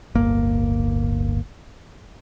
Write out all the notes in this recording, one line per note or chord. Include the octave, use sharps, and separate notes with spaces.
D1 G1 A#3